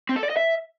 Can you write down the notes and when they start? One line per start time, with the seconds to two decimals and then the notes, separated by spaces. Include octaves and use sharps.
0.09 C4
0.16 A4
0.23 D5
0.30 D#5
0.37 E5